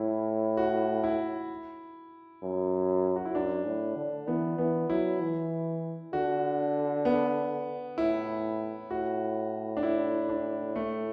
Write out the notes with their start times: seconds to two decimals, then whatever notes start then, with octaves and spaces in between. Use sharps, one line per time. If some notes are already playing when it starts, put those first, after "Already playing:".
Already playing: A2 E4
0.57 F#4
1.04 E4
2.43 F#2
3.16 F#4
3.25 E4
3.35 F#2 D4
3.65 A2
3.96 D3
4.27 E3 B3
4.58 E3 B3
4.90 F#3 E4
5.20 E3
6.13 D3 F#4
7.05 B3
7.98 A2 E4
8.91 A2 F#4
9.77 D4
9.83 E4
10.29 D4
10.76 A3